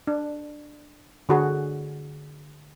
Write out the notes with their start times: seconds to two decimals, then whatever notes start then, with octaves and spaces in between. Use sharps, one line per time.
0.07 D4
1.29 D3 F#4 G#4